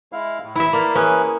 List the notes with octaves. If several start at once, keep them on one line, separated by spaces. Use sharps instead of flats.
G#3 E4 F5
A2
E4 E5
A#3 D5 F5
E3 C#4 G#4 B4